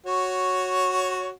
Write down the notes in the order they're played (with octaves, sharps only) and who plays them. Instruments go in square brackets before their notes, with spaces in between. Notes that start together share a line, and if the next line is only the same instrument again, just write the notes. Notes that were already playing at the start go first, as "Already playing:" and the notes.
[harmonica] F#4 C#5